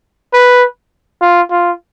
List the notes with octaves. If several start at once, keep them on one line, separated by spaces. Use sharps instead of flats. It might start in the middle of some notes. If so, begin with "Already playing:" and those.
B4
F4
F4